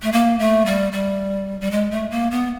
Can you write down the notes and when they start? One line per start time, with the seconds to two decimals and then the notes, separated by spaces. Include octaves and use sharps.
0.02 A3
0.12 A#3
0.39 A3
0.66 G3
0.93 G3
1.61 G3
1.71 G#3
1.91 A3
2.11 A#3
2.31 B3